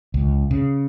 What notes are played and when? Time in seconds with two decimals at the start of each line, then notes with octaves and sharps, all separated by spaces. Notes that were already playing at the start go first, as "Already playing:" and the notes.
0.14 C#2
0.51 C#3